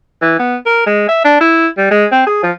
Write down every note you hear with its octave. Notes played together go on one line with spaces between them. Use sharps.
E3
B3
A#4
G#3
E5
D4
E4
G3
G#3
C4
G#4
F3